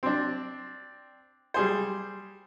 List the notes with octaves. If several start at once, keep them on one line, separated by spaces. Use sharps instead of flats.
C4 D4
G3 G#4 C5